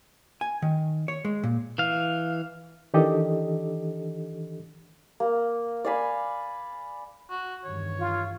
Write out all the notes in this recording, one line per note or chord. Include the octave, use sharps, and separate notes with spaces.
G#5
D#3
C#5
G#3
A#2
E3 F5
D#3 E3 D4 G4 A4 D#5
A#3
D5 F5 G#5 B5
F#4
E2 G2 D#3 C#5
F4